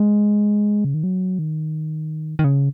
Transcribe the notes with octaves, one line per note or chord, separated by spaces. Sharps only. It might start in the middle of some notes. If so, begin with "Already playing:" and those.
Already playing: G#3
C#3
D#3
F#3
D#3
D#3
C#3